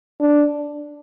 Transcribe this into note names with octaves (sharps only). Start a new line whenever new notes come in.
D4